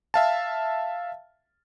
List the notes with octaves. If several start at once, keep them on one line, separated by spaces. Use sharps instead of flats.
E5 F5 A5